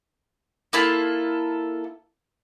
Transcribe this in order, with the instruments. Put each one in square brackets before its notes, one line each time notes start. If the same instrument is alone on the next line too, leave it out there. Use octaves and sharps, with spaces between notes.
[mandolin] A#3 E4 F4 A4